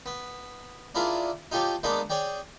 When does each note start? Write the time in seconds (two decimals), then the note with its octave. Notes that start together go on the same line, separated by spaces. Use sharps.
0.06 B3
0.95 D4 E4 F4 G#4 A#4 D5
1.52 D#4 F4 G4 A4 C#5 D6
1.83 G#3 A#3 B3 D4 D#4
2.10 G#4 C#5 D5 G5